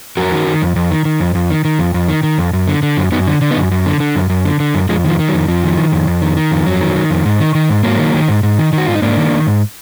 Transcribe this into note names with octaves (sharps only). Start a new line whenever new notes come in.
F2 F#4 A#4
D#3
D#3
F2
F2
D#3
D#3
F2
F2
D#3
D#3
F2
F2
D#3
D#3
F2
F#2
D3
D3
F#2
F#2 B3 D#4
D3
D3
B3 D#4
F#2
F#2
D3
D3
F#2
F#2
D3
D3
F#2
F2 F3 G#3
D#3 F3
D#3
F#3
F2
F2 F3
D#3
D#3
F2
F2
D#3
D#3
F2
F2 F#3
D#3
D#3
F2
G#2
D#3
D#3
G#2
G#2 F#3 A#3
D#3
D#3
G#2
G#2
D#3
D#3
F#4
G#2 F4
D#4
G#2 A#3 D4
D#3
D#3
G#2